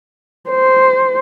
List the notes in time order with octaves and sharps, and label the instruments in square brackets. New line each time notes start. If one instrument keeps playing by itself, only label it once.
[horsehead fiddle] C5